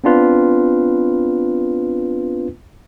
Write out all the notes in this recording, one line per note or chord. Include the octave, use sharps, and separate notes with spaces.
B3 C4 D4 F4 B4